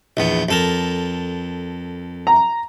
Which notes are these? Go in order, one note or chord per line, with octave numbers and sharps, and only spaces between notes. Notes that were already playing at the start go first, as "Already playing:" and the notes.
A#1 E2 B3
F2 A4 A#4
A#5